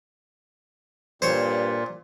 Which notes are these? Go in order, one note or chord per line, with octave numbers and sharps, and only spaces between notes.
G2 A#2 C5 C#5